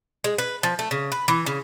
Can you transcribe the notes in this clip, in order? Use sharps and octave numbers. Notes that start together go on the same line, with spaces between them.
G#3
B4
F3
A3
C#3
B4
E3
C#3